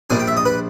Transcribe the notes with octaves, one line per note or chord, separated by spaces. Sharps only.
A#1 A#2 G3 G#5
G5
E5
D#5
B4